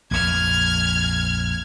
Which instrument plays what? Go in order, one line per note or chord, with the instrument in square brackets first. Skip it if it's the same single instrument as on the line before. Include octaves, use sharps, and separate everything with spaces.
[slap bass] A#1 F2 [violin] F6 G#6